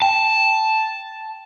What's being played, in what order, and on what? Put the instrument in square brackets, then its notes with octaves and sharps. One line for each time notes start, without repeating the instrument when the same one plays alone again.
[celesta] G5 [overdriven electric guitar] A5